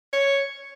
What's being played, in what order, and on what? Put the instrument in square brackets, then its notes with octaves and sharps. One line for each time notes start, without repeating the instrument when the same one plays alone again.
[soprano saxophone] C#5